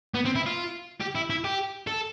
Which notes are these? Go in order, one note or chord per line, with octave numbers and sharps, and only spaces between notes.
B3
C4
E4
F4
G4
E4
E4
G4
A4